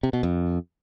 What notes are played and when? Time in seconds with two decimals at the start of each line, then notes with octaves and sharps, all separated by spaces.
0.03 C3
0.13 B2
0.23 F2